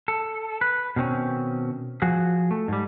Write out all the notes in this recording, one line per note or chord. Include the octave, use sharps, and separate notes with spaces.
A4
B4
B2 D#3 C4 C#4
F3 F#4 G#4
A3
G#2 G3